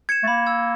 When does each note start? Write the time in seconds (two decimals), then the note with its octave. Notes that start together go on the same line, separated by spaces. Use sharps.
0.09 G#6 C#7 E7
0.24 A3
0.28 A#3 B5
0.46 E6 G#6